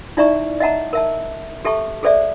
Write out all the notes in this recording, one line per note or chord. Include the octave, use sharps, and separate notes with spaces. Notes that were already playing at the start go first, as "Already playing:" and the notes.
D#4 E4 D5 E5 A#5 C#6
D#5 E5 F#5 A5 A#5
A#4 E5 A5
G4 A4 E5 A5 C#6
G#4 A4 C5 D5 E5